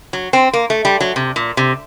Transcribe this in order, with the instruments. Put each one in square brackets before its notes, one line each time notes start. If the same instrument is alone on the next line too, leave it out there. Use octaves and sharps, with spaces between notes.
[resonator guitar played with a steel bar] F#3
C4
A#3
A3
G3
F#3
C3
A#2
C3